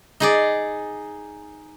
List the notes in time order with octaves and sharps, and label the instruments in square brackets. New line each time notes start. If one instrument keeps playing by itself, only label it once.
[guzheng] D#4 G#4 D5